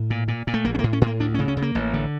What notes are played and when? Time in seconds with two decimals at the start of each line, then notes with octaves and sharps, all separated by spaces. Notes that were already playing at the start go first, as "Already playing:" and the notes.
Already playing: A2
0.10 A#2
0.28 A#2
0.47 A#2
0.54 A3
0.65 A#1 A#3
0.74 C#4
0.79 A#3
0.84 A2
0.93 C#4
1.01 A2
1.07 A#3
1.20 D2 D4
1.34 C#4
1.39 C#3
1.48 C#4
1.57 C#3
1.62 A#3
1.75 A1
1.94 D3